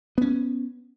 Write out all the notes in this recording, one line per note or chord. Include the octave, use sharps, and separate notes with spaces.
B3 C#4